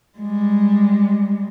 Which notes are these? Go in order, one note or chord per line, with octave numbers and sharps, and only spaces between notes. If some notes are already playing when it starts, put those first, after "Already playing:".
G3 G#3